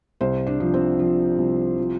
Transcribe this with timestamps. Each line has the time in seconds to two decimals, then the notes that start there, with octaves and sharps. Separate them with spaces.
0.21 C2 C5
0.47 D4
0.60 F3
0.74 C4
0.99 F3
1.38 C2
1.78 F3